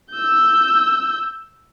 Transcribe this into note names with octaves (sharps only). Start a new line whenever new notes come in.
E6 G6